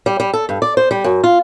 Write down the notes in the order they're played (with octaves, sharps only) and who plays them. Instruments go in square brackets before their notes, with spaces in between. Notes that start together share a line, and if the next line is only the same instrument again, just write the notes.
[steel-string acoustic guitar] G3
G3
A4
G2
D5
C5
G3
F#2
F4